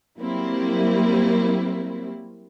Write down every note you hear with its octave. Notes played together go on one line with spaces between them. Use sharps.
F#3 G3 A#3 C4 E4